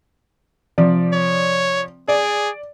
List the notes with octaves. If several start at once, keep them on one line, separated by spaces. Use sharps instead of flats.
C3 F3 D5
C#5
G#4 D5